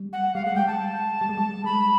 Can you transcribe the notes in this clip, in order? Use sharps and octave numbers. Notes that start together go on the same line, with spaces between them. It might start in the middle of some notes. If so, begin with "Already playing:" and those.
Already playing: G3
F#5
G3 F5
G#3 F#5
G3 G5
A5
G3
G#3
G3
G#3 B5